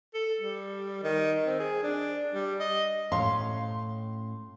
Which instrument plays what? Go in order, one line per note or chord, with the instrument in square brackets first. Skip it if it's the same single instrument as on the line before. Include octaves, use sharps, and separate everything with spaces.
[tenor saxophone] A4
G3
D#3
C4
G#4
D4
G3
D#5
[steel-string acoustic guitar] A2 C#4 F5 [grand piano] C6